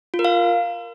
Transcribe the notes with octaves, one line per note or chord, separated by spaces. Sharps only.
F4
A#4
F5